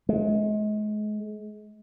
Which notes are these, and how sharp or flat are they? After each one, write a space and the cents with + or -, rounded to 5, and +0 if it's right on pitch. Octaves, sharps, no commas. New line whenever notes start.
G#3 +35